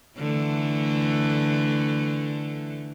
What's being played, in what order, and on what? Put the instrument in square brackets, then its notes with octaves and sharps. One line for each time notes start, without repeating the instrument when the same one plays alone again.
[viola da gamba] D3 E3 A3